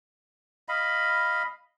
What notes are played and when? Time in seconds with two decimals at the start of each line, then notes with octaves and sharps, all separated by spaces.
0.69 D#5 F5 B5